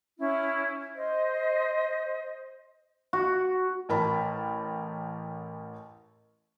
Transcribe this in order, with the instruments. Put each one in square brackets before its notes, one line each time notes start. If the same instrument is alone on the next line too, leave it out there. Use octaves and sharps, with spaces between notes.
[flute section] C#4 E4
C5 D#5
[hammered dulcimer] F#4
[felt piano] A1 A#4 A5 B5